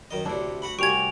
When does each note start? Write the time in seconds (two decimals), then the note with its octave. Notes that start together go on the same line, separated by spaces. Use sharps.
0.11 F#2 D#3 D#5
0.25 D2 C3 A3 D4 E4
0.62 F#4 F#5 B5
0.79 C2 C#4 F#4 G4 C#6 G#6 D7 F7